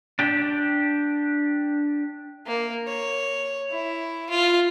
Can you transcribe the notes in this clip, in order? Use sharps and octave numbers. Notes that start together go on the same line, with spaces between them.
D4 G4
A#3
C#5
E4
F4